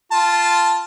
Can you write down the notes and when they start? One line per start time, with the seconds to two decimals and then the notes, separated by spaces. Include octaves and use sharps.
0.12 F4 A5